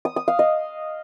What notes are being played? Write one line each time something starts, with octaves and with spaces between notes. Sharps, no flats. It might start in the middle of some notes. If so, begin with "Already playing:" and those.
D#6
D#6
F5
D#5